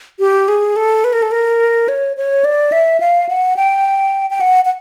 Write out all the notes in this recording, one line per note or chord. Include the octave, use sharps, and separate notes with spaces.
G4
G#4
A4
B4
A#4
A4
A#4
C#5
C#5
D5
E5
F5
F#5
G5
G5
F#5
F#5